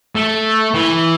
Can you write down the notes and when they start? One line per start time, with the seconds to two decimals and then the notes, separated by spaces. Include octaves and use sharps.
0.15 A3
0.74 E3